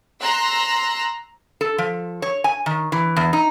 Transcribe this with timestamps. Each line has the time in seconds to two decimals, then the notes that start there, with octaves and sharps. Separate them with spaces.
0.20 A#5 C6 E6 F#6
1.61 A4
1.78 F3
2.22 C#5
2.44 G#5
2.66 D#3
2.92 E3
3.16 E2
3.33 D#4